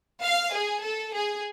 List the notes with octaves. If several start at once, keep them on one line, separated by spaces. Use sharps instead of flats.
F5
G#4
A4
G#4